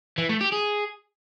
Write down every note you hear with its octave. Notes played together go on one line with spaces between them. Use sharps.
E3
A3
G4
G#4